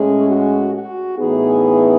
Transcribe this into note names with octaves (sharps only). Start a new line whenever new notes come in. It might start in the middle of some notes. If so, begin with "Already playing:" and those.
Already playing: A2 G#3 C#4 G#4
F#4
F#4
A2 E3 B3 D#4 G#4